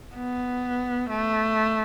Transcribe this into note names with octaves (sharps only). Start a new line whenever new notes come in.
B3
A3